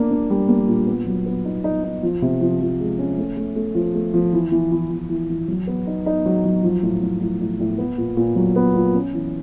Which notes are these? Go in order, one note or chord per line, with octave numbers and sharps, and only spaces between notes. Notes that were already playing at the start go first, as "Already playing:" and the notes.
Already playing: A#3 D4
D4
G3
A#3
A#2
B3
F#3
B3
D#4
D#4
D#4
F3
C3
F3
F3
G#3
C#4
A3
A3
A3
F3
A3
F3
E3
E3
E3
E3
E3
E3
F#3
B3
D#4
D#4
F#3
F#3
F3
A2
A2
A2
A2
A2
B3
A#2
A#2
F#3
B3
A#2
C#4
E3